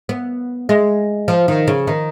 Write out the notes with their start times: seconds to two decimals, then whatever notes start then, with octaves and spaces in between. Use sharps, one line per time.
0.09 B3
0.69 G#3
1.28 F3
1.48 D#3
1.67 C#3
1.87 D#3